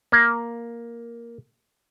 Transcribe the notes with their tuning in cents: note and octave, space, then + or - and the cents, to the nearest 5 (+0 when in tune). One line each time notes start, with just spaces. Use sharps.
A#3 +5